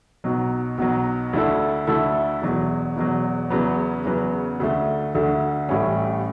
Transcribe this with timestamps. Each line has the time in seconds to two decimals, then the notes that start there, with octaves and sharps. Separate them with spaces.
0.24 B1 B2 F#3
0.78 B1 B2 F#3
1.33 D2 D3 A3 E4 A4
1.87 D2 D3 A3 E4 A4
2.42 E1 E2 B2 F#3
2.96 E1 E2 B2 F#3
3.50 E2 C#3 F#3 B3
4.05 E2 C#3 F#3 B3
4.60 D2 D3 A3
5.14 D2 D3 A3
5.69 A1 A2 G3 C#4